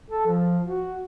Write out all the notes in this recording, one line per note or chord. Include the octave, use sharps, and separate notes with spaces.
A4
F3
F#4